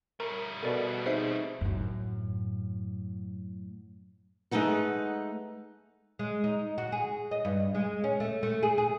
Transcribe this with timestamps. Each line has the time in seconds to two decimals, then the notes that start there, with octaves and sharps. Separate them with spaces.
0.20 G3 A3 A#4 A#5
0.63 B2 A4 A#4 D5
1.06 C4 D#4 G#4 C5 E5 C7
1.61 F#2 A2
4.51 G#3 A3 D#4 B4 F#5
6.19 G#3
6.44 D#4
6.78 F#4
6.92 G#4
7.31 D#5
7.45 G2
7.75 G#3
8.04 C#4
8.20 A3
8.43 A3
8.63 G#4
8.78 G#4